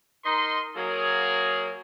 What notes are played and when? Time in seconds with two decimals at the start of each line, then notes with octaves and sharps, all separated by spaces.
0.24 D#4 A#4 D#5 C6
0.76 F#3 A#3 G#4